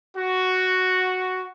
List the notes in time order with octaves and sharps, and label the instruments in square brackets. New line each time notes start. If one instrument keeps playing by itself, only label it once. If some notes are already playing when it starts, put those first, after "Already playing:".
[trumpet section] F#4